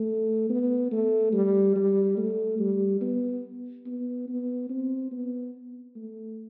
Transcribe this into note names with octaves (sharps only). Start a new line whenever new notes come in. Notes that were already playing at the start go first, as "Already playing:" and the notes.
Already playing: A3
B3
A3
G3
G3
A3
G3
B3
B3
B3
C4
B3
A3